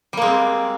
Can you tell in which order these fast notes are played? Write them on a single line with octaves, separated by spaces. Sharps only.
G3 A#3 G#3 C4